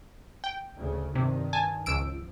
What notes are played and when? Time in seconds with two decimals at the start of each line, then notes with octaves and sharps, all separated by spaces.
0.44 G5
0.76 D2 C#3
1.15 G2 C3 D#3
1.53 G#5 A5
1.86 C#2 F3 E6 D7